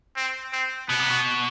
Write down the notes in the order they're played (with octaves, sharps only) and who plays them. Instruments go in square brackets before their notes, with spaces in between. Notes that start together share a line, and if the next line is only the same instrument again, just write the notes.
[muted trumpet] C4
C4
[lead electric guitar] B2 [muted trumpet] B3
[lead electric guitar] C3
B2